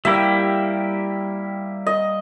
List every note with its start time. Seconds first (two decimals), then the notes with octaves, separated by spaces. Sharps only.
0.05 G3 A#3 E4 G4 E5
1.86 D#5